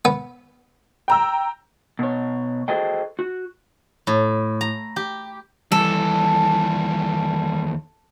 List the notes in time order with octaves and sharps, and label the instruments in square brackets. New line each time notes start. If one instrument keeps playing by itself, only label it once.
[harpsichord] B3
[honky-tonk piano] G5 A#5 E6
[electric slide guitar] B2 C#5
F#4 G#4 A4 C5 D#5 G5
F#4
[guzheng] A2
A#5
G4
[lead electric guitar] D#2 E3 [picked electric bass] G3 [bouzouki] A4